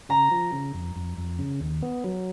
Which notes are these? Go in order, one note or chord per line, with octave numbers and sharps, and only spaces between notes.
C#3 A#5
F3
C#3
F2
F2
F2
C#3
D#2
B3
F#3